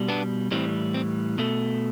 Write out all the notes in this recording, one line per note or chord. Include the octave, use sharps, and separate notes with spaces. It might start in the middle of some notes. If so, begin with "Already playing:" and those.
Already playing: B2 G3
B3 D4
A2 E3 G3 C4
C4
B2 A3